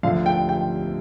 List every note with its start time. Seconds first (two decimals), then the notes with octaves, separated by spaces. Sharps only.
0.03 D2 D3 F3 F5
0.26 G5
0.49 G5